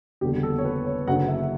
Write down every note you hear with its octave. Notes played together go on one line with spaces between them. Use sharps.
F#1 E2 D3 G3 B3 G4
A4
C#5
B4
C#5
F#1 F#2 D3 F#3 F#5
E5